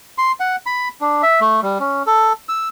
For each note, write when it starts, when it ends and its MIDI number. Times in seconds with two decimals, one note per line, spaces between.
0.18 0.32 84
0.40 0.56 78
0.66 0.88 83
1.01 1.22 62
1.23 1.40 76
1.41 1.61 57
1.63 1.78 55
1.80 2.03 61
2.07 2.33 69
2.49 2.69 88